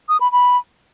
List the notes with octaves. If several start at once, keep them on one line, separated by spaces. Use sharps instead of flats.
D#6
B5
B5